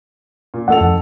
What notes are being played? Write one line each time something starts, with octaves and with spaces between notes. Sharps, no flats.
A#2
A1 A4 F#5 F7
F2